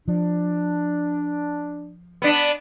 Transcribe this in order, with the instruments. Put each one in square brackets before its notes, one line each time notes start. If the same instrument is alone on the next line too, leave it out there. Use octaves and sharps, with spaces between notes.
[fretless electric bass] F3 [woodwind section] D4
[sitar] B3 D4